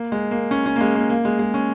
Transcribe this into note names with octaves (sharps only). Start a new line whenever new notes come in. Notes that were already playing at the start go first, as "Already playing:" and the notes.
Already playing: A#3
G#3
A#3
C#4
C#4
A#3
G#3
A#3
A#3
G#3
G#3
C#4